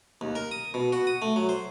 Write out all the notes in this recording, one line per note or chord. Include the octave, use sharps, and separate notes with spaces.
D#2
A#4
D#6
B2
F#4
D#6
A3
F#3
C5